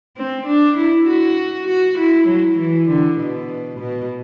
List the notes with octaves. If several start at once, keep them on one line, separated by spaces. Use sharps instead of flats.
C4
D4
E4
F#4
F#4
E4
F#3
E3
D3
B2
B2